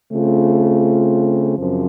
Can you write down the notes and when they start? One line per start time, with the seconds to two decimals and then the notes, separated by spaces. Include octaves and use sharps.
0.12 C#3 A3 C4 F4
1.57 F#2 C#3 F3 C4